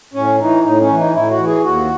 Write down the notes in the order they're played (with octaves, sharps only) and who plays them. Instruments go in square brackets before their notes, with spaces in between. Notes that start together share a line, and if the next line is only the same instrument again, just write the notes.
[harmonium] A2 C#4
E3 D#4
A2 D#4
C#4
E3
D#4
A2 E4
F#4
E3
G#4
D#2 F#4